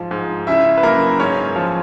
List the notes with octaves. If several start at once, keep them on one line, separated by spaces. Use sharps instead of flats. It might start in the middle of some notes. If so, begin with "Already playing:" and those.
Already playing: G#2 F3
G#2
C#3 E4 E5
B4
F#2 A#3 A#4
G#2 C#4 C#5
F3